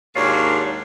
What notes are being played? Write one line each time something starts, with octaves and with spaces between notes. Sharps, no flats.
D#2 G#2 D4 F#4 C#5 F5